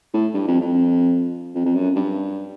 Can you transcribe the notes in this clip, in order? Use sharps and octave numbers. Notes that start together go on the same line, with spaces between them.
A2
G2
F2
F2
F2
F2
F#2
G2